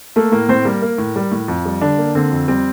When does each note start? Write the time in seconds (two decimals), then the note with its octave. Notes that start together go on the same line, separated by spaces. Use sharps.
0.16 A3 A#3 A4
0.32 A2 A#3 A#4
0.48 A2 C4 C5
0.65 G3 A#3 A#4
0.82 A#3
0.98 A2
1.16 G3
1.31 A2
1.48 F2
1.65 G3
1.81 D3 D4
1.98 A#3
2.15 D3 C4
2.31 F2
2.48 G3 C4